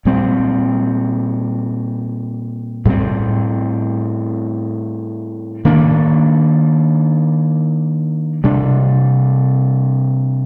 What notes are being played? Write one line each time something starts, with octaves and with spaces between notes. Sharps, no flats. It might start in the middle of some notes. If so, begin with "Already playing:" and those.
A#2 G3 C4
A2 G3 C4
D#3 A#3 D4
C3 G3 D4